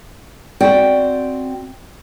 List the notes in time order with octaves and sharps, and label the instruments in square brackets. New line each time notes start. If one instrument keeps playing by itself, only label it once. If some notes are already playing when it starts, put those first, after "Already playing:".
[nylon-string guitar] C4 F#4 D5 G5